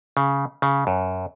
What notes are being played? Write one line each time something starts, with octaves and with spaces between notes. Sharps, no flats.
C#3
C#3
F#2